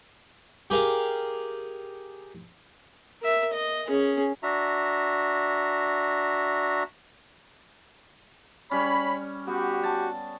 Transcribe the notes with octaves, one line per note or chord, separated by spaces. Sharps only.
G4 G#4 A#4 F5
A#4 E5
D#5
C#4 G#4
D4 F#4 E5 A#5
G3 C#4 C#5 B5
B3 F#4 G4
A5